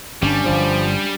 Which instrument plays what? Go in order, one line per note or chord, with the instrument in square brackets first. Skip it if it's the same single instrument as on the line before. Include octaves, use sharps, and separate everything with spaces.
[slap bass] G1 [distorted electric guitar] G3 [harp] C#4 D4
[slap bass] G1 G2 [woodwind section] F3